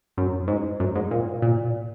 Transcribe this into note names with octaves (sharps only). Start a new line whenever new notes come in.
F#2
G#2
F#2
G#2
A#2
A#2